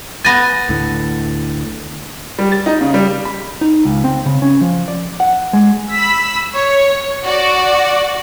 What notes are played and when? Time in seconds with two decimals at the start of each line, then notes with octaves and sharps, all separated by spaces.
0.25 B3 G#5 A6 A#6
0.69 D2 A2 D3
2.38 G3
2.52 A6
2.66 D#4
2.81 C#3
2.94 G3
3.25 B5
3.61 D#4
3.85 C#2
4.04 C4
4.26 C#3
4.42 C#4
4.61 F3
4.88 D5
5.20 F#5
5.53 G#3
5.91 B5 E6 B6
6.54 C#5
7.24 F#4 D5